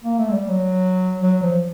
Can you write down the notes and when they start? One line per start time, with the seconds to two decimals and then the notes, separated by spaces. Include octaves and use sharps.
0.04 A#3
0.19 A3
0.29 G#3
0.33 G3
0.49 F#3
1.22 F#3
1.42 F3